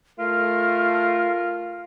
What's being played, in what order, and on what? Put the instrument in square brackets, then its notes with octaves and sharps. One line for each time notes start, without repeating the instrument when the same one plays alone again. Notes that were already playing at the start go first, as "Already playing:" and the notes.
[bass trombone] A3 [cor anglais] F4 [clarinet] A#4 [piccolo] F6